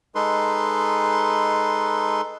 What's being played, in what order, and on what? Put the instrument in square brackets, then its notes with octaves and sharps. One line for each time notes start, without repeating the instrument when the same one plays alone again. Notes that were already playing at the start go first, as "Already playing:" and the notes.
[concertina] G#3 D#4 A4 B4 C6